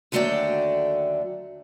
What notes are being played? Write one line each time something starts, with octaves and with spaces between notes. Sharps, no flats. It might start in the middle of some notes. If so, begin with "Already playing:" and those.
D#2 D3 F#3 A3 D5 G5